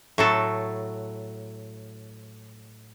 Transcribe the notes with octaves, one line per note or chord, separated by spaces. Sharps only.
A2 F#3 A4